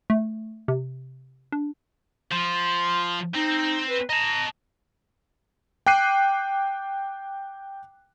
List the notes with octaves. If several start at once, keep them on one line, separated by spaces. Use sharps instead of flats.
A3
C3
D4
F3 C6
C4 D#4
B4
D#5 A5 A#5
G5 D6 F#6 C7 D#7